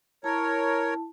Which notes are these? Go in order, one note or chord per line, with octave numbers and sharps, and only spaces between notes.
E4 A#4 C#5 A5